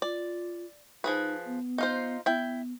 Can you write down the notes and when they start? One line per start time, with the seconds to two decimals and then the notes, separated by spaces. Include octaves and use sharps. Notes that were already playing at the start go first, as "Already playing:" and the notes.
0.02 F4 D5
1.04 F3 D#4 G#4 B4
1.46 B3
1.78 D#4 F4 C5
2.26 B3 E4 G5